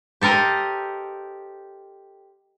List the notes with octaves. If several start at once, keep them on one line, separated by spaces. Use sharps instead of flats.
G4 A4 A#4 C5 D#5